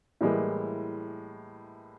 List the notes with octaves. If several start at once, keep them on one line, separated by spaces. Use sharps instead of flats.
A2 E3 G3 G#3 A#3